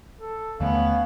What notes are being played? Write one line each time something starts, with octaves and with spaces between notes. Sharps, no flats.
A4
D#2 D3 A3 B3 C#4 F5